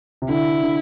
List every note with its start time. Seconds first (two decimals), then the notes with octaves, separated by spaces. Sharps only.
0.22 C3
0.29 D3 E4
0.63 D3